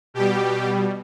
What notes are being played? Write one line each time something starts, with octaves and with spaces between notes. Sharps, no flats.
B2 G3 G4